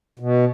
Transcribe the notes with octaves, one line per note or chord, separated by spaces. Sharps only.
B2